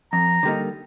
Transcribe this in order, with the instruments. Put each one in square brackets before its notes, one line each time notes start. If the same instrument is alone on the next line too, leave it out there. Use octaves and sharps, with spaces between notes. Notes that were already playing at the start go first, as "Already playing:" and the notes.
[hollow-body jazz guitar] F2 [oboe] A#5
[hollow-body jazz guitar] D3 G3 A#3 D#4